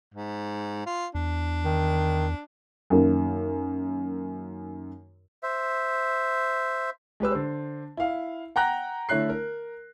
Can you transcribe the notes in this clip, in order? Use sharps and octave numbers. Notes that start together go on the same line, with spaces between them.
G#2
F4
E2 D4
D#3
F#2 D#3 A#3
C5 E5
G#3 G4 B4 E6
D3 C5
E4 F5
F#5 G5 A#5 F#6 A#6
D3 A3 E4 C#5 F#6 C7
A#4